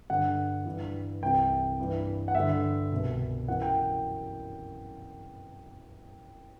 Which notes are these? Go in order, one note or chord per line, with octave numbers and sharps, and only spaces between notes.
G2 D3 F#5
G2 E3
C2 C3 E3 G5
G2 E3
F#5
G2 D3 E5
C2 B2
F#2 E3 F#5
G5